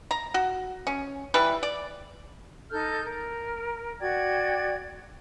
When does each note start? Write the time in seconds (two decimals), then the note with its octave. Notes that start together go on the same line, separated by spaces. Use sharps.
0.11 A#5
0.34 F#4
0.87 C#4
1.34 E3 G3 B4
1.63 D5
2.71 D#4 A4 F6 G6
3.04 A#4
4.00 F#4 D5 G5 G#6